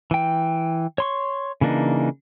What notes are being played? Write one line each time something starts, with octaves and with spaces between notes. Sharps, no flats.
E3 G5
C#5 C6 C#6
C#3 E3 A#3 D4 D#4